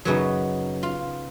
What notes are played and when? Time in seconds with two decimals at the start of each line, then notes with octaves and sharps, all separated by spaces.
0.05 F#2 C#3 F#3 B3 D#4
0.83 F4